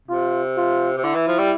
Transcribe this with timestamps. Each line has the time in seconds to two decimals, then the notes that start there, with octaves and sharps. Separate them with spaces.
0.08 C3 F4
0.57 F4
0.97 C3
1.04 D3 E4
1.15 E3
1.28 F3
1.39 G3